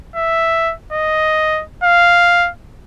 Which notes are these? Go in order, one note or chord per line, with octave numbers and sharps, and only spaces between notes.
E5
D#5
F5